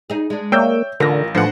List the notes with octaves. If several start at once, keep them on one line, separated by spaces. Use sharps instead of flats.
D#4 G#4
G#3 D4
A#3 C#5 D5 E5 G5 E6 G6
A1 D3 F4 A#4 A#6
D#2 A2 F3 B3 D4 C5 F#5